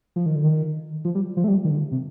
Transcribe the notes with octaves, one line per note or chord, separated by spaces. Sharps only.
F3
D#3
D3
D#3
F3
G3
F3
A3
G3
D#3
D3
C3